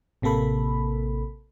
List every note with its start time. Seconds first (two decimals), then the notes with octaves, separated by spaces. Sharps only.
0.22 A1 C3 A#3 A4 B5